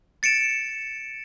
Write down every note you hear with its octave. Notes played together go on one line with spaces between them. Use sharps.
A6 C#7 D7 E7